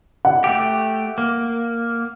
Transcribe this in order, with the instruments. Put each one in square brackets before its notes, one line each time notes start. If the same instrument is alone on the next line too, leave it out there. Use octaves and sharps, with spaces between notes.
[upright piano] F#5
[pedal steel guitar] A3 G4
A#3